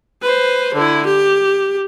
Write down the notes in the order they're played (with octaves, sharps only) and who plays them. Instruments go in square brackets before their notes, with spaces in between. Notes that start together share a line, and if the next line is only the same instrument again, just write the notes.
[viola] B4 C5
D3 E4
G4